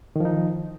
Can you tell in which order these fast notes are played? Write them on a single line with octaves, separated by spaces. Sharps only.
D#3 F3 D#4